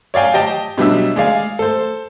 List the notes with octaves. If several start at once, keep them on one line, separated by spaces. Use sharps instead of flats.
C#5 D5 F5 G5 G#5
G4 D#5 G5 A5
B2 F#3 G3 D4 E5 E6
G#3 D5 F5 G#5
A4 C5